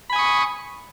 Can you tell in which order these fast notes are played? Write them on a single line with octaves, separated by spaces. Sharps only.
B5 G#5 D#6 C#6